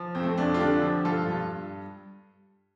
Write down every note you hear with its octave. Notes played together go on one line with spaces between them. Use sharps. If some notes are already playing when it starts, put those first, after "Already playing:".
Already playing: F3
F2 C4
A3
C4
F2 A3 D4
F4
D3 D4 G4
F3
G2 F4 A4
G2